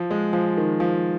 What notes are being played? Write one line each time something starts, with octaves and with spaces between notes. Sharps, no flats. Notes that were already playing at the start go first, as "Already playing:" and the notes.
Already playing: F3
G#3
F3
D#3
F3